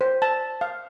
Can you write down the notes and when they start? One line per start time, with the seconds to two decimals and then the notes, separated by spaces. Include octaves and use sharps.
0.01 C5
0.22 A5
0.61 F5